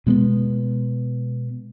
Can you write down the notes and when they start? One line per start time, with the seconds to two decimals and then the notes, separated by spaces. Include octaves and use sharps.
0.07 B2 G#3 A3 B3